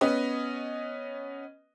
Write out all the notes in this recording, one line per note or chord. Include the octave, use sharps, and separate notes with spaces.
B3 C#4 B4 D#5